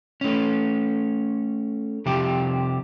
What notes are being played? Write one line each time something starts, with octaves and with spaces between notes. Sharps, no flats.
A3 C#4
C3 F3 G3 G4